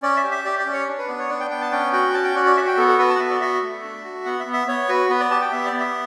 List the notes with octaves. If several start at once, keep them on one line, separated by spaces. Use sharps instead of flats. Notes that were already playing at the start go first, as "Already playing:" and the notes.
C#4 D5
E5
G4
E5
G4 D5
D5
C#4
C#5
D4
B4
B3 D5
C#5
D4 D5
G5
B3 G5
A5
C#4 G5
F#4 G5
C#4 A5
G5
F#4 D5
D5
F#4 E5
G5
B3 A4
A4
F#4 B4
A5
F#5
B3 E5
D5
F#4 E5
A3
D4
F#4
B3 F#5
E5
B3
E5
B3 C#5
F#4 B4
B3 B4
D5
G4 A5
G5
B3 E5
D5
B3
E5